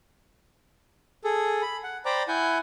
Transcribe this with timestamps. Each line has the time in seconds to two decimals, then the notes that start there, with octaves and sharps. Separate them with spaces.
1.24 G#4 A4
1.62 B5
1.84 F#5
2.05 C5 D5 G5 A#5 B5 D6
2.28 E4 F#5 G#5 G6